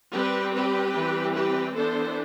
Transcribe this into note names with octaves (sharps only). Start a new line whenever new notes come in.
G3 C4 G4 B4
G4 B4
E3 G3 C4
G4 B4
E3 B3 D4 A4 C5